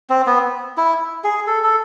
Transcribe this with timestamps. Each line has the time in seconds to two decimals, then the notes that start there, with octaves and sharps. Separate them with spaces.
0.10 C4
0.26 B3
0.78 E4
1.24 G#4
1.47 A4
1.64 A4